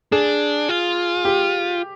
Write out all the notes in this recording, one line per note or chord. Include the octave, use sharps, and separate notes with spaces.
D4 G#4
F4
G4